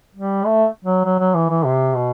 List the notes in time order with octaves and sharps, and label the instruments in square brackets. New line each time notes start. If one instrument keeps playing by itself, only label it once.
[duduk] G3
A3
F#3
F#3
F#3
E3
E3
C3
B2